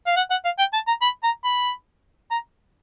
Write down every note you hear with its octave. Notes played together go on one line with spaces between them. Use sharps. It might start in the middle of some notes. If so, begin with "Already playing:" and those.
F5
F#5
F#5
F5
G5
A5
A#5
B5
A#5
B5
A#5